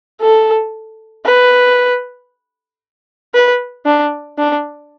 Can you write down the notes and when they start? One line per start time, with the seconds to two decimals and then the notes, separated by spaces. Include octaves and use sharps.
0.21 A4
1.26 B4
3.34 B4
3.86 D4
4.38 D4